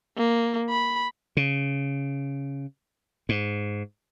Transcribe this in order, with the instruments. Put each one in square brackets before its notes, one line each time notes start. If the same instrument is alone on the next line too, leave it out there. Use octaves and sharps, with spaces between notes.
[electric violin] A#3
B5
[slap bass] C#3
G#2